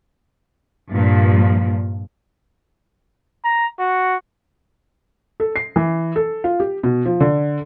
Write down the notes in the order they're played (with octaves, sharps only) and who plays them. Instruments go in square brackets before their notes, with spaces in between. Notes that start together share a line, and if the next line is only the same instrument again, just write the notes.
[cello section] G2 A#2 F3
[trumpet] A#5
F#4
[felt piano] A4
C7
E3
A4
F4
G4
B2
F3
D3